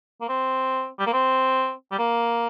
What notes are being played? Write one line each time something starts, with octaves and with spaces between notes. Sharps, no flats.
A#3
C4
G3
A#3
C4
G3
A#3